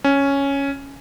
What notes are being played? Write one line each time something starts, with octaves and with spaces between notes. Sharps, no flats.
C#4